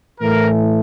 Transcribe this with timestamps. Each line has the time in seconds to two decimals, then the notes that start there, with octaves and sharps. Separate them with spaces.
0.19 A2 E3 A3 A#4